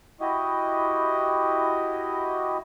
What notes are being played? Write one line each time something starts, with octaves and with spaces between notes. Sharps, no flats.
E4 F#4 G4 D#5